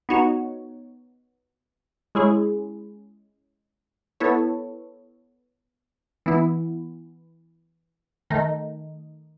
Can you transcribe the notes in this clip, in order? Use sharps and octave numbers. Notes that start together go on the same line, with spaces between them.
B3 D#4 F#4 C#5
G#3 C#4 E4 G#4
B3 E4 A4 C#5
E3 B3 E4
D#3 A3 D#4